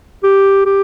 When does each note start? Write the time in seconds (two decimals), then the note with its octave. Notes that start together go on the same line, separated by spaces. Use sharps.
0.24 G4
0.66 G4